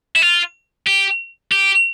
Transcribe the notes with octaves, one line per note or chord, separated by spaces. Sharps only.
E4
F4
G4
G4